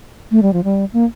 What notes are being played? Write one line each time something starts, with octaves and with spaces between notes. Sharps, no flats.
A3
G3
F3
G3
A#3